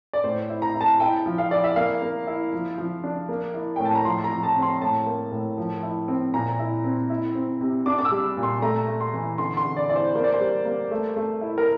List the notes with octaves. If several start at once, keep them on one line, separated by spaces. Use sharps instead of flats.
D5
A2 C5
E4
A#5
E4
A5
E4 G5
F3
F5
E4 D5
E5
A#3 F5
A#3
E4
F3
F3
D4
A#3
E4
A2 G5
A5
A#5
F3 C6
A#5
F3
A5
C4
C6
A2 A5
A#3
A2
F3
E4
C4
A#2 A#5
E4
C4
E4
C4
C3
D4 D6
D6
E6
G3
A#2
C6
A3 A#5
A3
C6
E3
D3 C6
C6
D3
D5
E4 D5
C5
A#3 C5
D5
C5
G3
A#3
A3
A3
E4
A#4